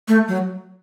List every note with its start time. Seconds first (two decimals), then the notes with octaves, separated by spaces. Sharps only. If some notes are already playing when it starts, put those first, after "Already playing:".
0.08 A3
0.28 F#3